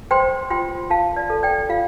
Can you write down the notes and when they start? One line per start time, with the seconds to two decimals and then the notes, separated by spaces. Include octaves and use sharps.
0.11 C5 G5 C6
0.50 F4 G5 C6
0.90 F4 F5 A5
1.16 D5
1.30 A4
1.43 D5 G5
1.69 F4 F5